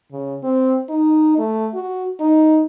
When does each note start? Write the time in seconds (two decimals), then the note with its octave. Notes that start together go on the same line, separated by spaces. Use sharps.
0.12 C#3
0.44 C4
0.89 D#4
1.38 A3
1.74 F#4
2.20 D#4